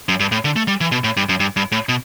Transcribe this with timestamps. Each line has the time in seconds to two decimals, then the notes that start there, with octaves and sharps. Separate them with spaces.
0.09 F#2
0.20 G2
0.32 A2
0.45 D3
0.56 A3
0.68 G3
0.81 E3
0.92 B2
1.04 A2
1.17 G2
1.29 F#2
1.40 G2
1.57 G2
1.72 A2
1.89 B2